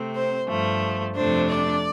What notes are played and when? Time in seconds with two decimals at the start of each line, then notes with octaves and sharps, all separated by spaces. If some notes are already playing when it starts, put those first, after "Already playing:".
Already playing: C3 A3 C4
0.14 C5
0.47 G2 F3 A3
1.15 F2 C3 A3 D4 C5
1.48 D5